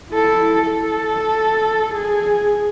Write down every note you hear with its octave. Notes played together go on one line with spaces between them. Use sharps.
E4 A4
A4
G#4